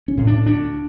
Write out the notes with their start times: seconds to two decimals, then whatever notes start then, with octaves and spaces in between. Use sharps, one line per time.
0.08 C#4
0.17 A2
0.27 D4
0.46 D2 D4